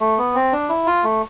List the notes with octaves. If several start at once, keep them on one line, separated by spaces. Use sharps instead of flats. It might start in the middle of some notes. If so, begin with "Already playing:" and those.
A3
B3
C4
D4
E4
F4
A3